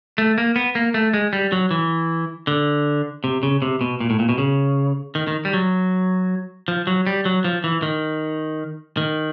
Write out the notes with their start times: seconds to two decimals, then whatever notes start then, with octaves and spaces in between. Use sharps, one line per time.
0.18 A3
0.38 A#3
0.56 B3
0.75 A#3
0.94 A3
1.14 G#3
1.33 G3
1.52 F#3
1.71 E3
2.47 D3
3.24 C3
3.43 C#3
3.62 C3
3.81 B2
4.00 A#2
4.10 A2
4.19 A#2
4.29 B2
4.38 C#3
5.15 D#3
5.27 D#3
5.45 G3
5.54 F#3
6.68 F3
6.87 F#3
7.07 G3
7.25 F#3
7.44 F3
7.64 E3
7.82 D#3
8.97 D#3